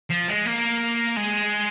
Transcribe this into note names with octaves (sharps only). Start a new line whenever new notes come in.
F3
G#3
A#3
G#3